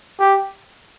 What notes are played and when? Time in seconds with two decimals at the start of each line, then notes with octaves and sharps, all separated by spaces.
0.19 G4